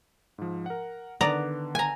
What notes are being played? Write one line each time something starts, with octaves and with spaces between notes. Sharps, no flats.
G#2 F3
A#4 F#5
D3 D#3 B3 D5 A#5
G#5 A#5